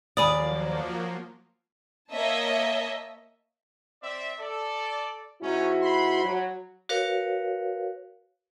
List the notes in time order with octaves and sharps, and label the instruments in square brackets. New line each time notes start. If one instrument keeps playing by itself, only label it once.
[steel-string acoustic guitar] D#2 D5 [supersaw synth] F3 F#3 A#3 [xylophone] G#5 B5 D#6
[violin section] A#3 C#5 D#5 E5 A5
[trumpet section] C4 D5 E5
A4 D5
[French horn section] G#2 E4 F#4 [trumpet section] C#4 D#4
[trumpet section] B5 C6
[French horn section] F#3
[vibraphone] F#4 A#4 B4 C#5 F5